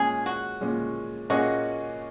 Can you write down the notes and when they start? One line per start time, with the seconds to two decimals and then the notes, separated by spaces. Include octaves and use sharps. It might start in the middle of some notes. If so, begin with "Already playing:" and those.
Already playing: A#2 G#3 C#4 G#4
0.26 F#4
0.61 A#2 G#3 C#4
1.30 A#2 A#3 C#4 F#4 G#4 D#5